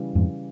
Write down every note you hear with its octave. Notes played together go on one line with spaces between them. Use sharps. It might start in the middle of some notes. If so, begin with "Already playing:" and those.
Already playing: C#3 E3 G3
F2 G#2